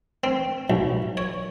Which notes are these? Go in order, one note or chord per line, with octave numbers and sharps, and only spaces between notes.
C4
B1
C#5